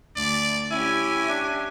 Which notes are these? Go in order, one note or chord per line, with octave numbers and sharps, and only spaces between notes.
D2 D5
C#4 E4 G4 G#5
D4